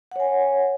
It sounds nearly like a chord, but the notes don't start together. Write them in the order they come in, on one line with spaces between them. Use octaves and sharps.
F#5 C#5 G#5